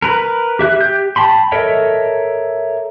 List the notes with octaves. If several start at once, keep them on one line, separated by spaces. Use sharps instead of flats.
A#4 B4
G4 E5 F#6
G4 G6
G5 A5 B5 C6
A4 A#4 C#5 D#5 E5